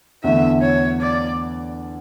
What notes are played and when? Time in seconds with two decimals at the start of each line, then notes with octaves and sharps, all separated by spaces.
0.24 E2 D3 A3 E5
0.62 C#5
1.02 D5